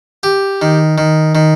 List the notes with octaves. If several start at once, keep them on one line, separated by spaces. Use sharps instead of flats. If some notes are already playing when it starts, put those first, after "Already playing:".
G4
D#3
D#3
D#3